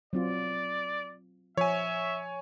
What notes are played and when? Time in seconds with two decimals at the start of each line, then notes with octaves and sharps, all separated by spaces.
0.13 F#3 C4 F4 D5
1.57 F3 C#5 E5 G#5